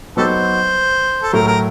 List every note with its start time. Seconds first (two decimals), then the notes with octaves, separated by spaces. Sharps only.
0.17 F#3 B3 D#4 F#4 G4 A4 C5
1.23 A4
1.33 A2 F#3 A3 A#4
1.47 A#4